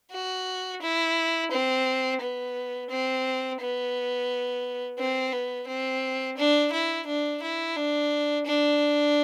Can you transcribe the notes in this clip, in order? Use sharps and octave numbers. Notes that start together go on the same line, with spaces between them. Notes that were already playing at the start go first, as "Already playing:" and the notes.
F#4
E4
C4
B3
C4
B3
C4
B3
C4
D4
E4
D4
E4
D4
D4